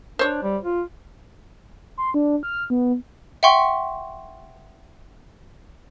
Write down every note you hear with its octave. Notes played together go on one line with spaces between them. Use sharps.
D4 C5 C#5
G3
F4
C6
D4
F6
B3
E5 F#5 G5 C6 C#6